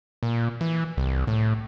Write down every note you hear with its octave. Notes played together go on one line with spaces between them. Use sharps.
A#2
E3
C2
A2